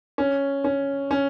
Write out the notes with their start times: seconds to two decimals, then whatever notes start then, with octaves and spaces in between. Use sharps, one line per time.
0.18 C#4
0.64 C#4
1.11 C#4